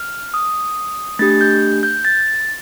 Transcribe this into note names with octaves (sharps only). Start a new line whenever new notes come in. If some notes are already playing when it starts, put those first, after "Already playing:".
Already playing: F6
D#6
A3 D4 G4 A6
G6
G6
A6